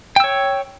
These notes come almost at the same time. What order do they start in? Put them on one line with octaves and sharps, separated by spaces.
G5 E6 C#5